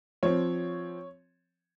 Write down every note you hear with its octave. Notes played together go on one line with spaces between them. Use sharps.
F3 C4 C#5